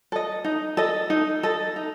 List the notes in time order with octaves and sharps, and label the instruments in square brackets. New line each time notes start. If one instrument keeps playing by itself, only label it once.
[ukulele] A4 D#5
D#4
A4 D#5
D#4
A4 D#5
D#4